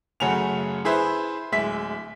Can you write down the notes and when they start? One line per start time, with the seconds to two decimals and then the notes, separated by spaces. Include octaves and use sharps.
0.20 F#2 C#3 A3 F#5 G#5 F7
0.85 E4 G#4 B4 C5 E5
1.52 D1 G#3 E5 B6